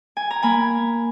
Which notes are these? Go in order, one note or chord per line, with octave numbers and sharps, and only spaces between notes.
G#5
A#5
A#3 G#5 B5